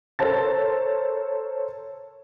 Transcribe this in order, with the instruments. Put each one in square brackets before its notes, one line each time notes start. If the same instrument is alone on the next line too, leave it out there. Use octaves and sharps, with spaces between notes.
[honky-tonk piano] A4 A#4 C5 C#5 A5 A6